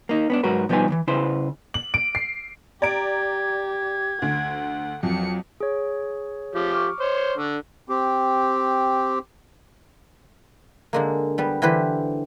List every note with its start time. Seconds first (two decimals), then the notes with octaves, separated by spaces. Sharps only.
0.09 A#3 D#4
0.30 B3 C#4 D4
0.43 G#2 F#3 F#4 A#4 B4
0.69 B2 F3 G3 D#4 B4 G#5
0.88 E2 E3
1.07 C#3 E4 B4 C5 C6
1.74 F#7
1.94 D7
2.15 C7
2.82 G4 D5 A#5 G#6 D7
4.22 D2 F#5
5.03 F2 F#3 C#7
5.60 G#4 C#5
6.55 F3 G4
6.75 C#6 D6 F6
7.00 C5 C#5
7.38 D3
7.89 C4 G4
10.93 D3 G#3 A#3
11.38 G3 B3
11.62 D3 E3 G4 B4 C5